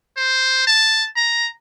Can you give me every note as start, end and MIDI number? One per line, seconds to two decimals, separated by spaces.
0.17 0.64 72
0.67 1.06 81
1.16 1.49 82